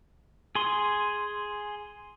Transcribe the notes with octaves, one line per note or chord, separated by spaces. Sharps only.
G#4 C6